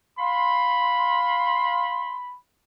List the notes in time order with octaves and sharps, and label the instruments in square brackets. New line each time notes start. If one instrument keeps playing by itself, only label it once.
[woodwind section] F5 C6 [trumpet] B5